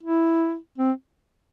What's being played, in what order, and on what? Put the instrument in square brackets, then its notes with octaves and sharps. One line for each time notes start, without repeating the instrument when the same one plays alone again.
[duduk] E4
C4